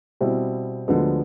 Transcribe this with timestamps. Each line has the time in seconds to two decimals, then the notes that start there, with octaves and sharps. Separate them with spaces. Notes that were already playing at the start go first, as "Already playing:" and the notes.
0.21 B2 G3 C4 E4
0.88 D2 D3 F3 G#3 B3